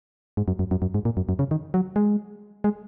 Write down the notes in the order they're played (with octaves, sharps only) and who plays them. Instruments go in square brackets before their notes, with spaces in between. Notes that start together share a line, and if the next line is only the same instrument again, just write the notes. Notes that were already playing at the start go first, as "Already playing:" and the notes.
[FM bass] G#2
F#2
F#2
F#2
F#2
G#2
A#2
F#2
F#2
C#3
D#3
F#3
G#3
G#3